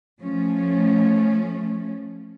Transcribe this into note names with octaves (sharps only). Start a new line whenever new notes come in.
F3 A3 C#4